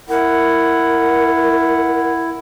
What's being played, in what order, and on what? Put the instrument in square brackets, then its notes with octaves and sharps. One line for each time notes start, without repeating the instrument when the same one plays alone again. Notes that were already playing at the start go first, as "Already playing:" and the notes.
[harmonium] E4 [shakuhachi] A#4 [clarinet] F#5